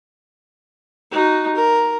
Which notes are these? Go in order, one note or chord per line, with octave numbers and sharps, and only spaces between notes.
D#4 F#4
A#4